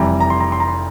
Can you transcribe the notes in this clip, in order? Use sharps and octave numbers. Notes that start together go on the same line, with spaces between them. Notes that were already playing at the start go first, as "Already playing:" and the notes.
Already playing: F1 F2 E3 G3 A#5
A#5
C6
A#5
C6
A#5
C6